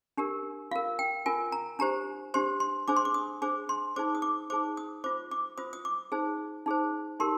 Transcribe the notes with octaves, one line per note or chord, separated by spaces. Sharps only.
D4 G4 A#4
F4 A#4 F5
G5
F4 A#4 G#5
A#5
D4 G4 C5 A#5
D4 G4 C5 C6
C6
D4 G#4 C5 D6
C6
D6
D#6
D4 G#4 C5 D6
C6
D#4 G#4 C5 D6
D#6
D6
D#4 G#4 C5 D6
D#6
F4 C5 D6
D6
F4 C5 D#6
D#6
D6
D#4 G#4 C5
D#4 G#4 C5
D#4 G4 A#4 C6